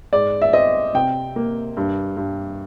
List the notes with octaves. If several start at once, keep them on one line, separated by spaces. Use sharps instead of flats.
G#2 D5
E5
C4 D#5
C3 G5
A#3
G2
G2